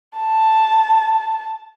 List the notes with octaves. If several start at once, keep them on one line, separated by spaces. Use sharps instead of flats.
A5